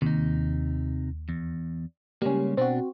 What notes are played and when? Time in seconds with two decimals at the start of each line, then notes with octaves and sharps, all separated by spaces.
0.02 D#2 C3 D#4
1.29 E2
2.22 C#3 G3 G#3 A#3 C#4
2.57 B2 C4 D4 F#4